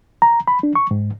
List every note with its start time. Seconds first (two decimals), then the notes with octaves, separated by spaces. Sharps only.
0.22 A#5
0.48 B5
0.63 D4
0.75 C#6
0.91 G#2